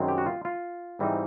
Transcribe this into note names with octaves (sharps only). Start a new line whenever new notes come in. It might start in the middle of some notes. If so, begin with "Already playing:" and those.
Already playing: F#2 D#3 G#3 C4 D#4
G4
F#4
F4
F4
G#2 E3 G3 C4 D#4